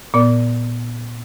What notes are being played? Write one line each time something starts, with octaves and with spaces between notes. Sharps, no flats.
A#2 B3 A#4 D5